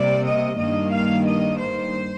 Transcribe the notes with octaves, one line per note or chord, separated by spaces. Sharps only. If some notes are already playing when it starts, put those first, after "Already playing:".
Already playing: C3 G3 A#3 D5
D#5
G2 D#3 A#3 D#5
F5
D#5
C5